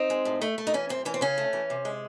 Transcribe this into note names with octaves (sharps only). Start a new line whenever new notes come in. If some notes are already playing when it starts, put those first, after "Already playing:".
Already playing: C4 D#4
G#3
A2
A3
A3
D#4
E3 C#4
F#2 C4
E3 C#4
C4
C#3 C#4
A3
E3
C3
G#3